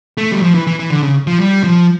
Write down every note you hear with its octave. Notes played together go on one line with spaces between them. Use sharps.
A3
G3
F3
E3
E3
E3
D3
C#3
F3
G3
F3